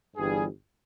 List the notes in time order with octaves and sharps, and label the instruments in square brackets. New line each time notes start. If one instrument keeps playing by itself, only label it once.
[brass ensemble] G1 G2 E3 G3 G#4